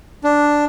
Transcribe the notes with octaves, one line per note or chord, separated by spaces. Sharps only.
D4